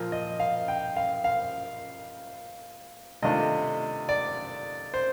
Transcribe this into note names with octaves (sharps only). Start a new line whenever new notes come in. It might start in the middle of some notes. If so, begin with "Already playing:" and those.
Already playing: A#2 F3 A#3 F4
D#5
F5
G5
F5
F5
C3 D#3 A3 D4 F4 D#5
D5
C5